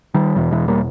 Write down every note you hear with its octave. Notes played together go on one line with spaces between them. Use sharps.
D#3 G3
E2 B2 E3
E3 G#3
G3 A#3